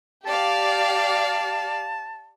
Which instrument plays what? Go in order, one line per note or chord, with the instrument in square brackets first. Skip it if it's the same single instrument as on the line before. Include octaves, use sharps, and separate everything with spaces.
[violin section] G4 D5 F5 [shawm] A5